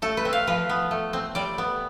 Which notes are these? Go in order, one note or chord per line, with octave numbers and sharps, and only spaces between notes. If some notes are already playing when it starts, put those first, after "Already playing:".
A3 A4
B4
C4
F5
F3 B4
B3
A3
C4
G3 D5
B3